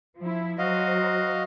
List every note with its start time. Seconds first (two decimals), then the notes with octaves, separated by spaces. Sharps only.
0.18 F3 E4
0.59 F#3 F#4 C5 D#5 F5